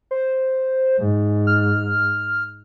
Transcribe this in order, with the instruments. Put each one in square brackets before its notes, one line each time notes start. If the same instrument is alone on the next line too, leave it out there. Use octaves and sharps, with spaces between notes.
[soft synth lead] C5
[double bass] G#2
[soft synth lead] F6